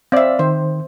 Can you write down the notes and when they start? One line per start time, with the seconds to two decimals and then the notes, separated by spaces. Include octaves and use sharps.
0.12 C4 D5 E5 F5
0.39 D#3 C5